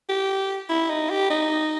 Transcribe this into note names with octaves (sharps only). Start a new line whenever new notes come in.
G4
E4
D#4
G4
D#4